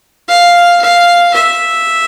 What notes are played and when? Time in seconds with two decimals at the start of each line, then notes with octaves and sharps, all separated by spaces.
0.28 F5
0.81 F5
1.33 E5